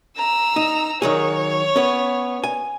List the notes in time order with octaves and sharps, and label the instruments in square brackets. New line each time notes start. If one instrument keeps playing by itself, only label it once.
[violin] A#5 E6
[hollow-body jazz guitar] D#4
[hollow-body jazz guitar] D#3 F#3 G#4 [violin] C#5
[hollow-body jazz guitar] B3 C#4
G#5